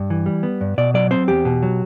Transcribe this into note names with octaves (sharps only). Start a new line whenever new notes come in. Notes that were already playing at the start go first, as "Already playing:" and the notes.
Already playing: G2
E3
G3
B3
G2
B2 D5
F#3 D5
C4 C5
E2 G4
B2
F#3